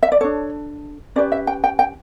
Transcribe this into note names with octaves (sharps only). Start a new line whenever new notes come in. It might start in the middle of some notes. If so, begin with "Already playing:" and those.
E5
D5
D4 A4 C#5
C#4 G4 B4 D5
E5
G5
G5
G5